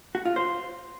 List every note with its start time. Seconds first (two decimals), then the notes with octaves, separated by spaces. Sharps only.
0.15 F#4
0.25 F4
0.36 C5